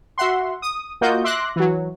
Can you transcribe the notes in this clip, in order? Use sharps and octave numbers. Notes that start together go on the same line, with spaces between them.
F#4 E5 F#5 C6
D#6
A#3 F4 F#4 D#5 G6
E5 C6 D6 F#6 A#6
E3 F#3